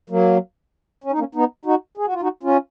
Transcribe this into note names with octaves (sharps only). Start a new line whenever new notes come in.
F#3 A#3
C#4
D#4
A#3 C#4
B3 D#4
D#4 F#4
G#4
F#4
F4
D#4 F#4
C#4 F4